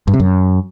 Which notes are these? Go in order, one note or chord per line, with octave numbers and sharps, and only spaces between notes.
G2
C3
F#2